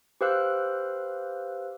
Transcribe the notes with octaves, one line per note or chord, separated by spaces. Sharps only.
G4 B4 C5 F5 E6 F#6